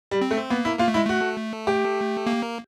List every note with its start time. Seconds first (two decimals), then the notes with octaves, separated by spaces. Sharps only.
0.11 G3
0.21 C4
0.31 A3
0.50 A#3 B3
0.65 E4
0.79 A#3 F4
0.88 A3
0.94 G#3 E4
1.05 A3 F#4
1.67 G4
2.27 A#3